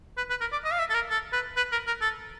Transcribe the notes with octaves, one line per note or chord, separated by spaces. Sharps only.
B4
B4
A#4
D5
D#5
F5
E5
A4
A#4
A4
B4
B4
A#4
A#4
A4